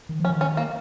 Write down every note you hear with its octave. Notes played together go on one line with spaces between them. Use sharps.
D#3
F3 C#4
D#3
C#4
A#3